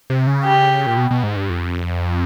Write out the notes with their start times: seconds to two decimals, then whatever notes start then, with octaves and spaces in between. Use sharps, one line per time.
0.10 C3
0.27 C#3
0.44 G4
0.86 A#2
0.97 B2
1.11 B2
1.23 G#2
1.36 G2
1.50 F2